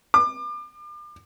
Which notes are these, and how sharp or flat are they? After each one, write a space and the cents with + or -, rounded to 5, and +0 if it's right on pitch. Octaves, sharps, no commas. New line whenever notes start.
D6 +35